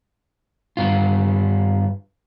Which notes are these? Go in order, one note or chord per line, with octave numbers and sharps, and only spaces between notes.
G2 F4